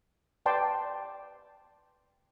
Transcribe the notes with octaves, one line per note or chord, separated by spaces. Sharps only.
B4 D5 G5 A5 C6